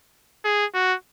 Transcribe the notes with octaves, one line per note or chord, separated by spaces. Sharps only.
G#4
F#4